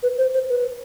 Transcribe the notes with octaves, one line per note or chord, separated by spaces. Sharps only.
B4
C5
C5
B4